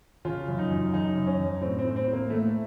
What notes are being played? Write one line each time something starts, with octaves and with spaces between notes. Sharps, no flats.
C#3 F4
F#2
D#4
F#2
C#3 D#4
F#2
C#4
F#2
A2 C4
C4
A2
C4
A2
A#3
A2 A3